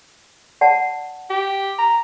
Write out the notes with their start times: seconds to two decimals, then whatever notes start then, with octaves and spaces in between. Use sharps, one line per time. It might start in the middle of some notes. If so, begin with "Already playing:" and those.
0.61 D5 F#5 A5
1.30 G4
1.79 A#5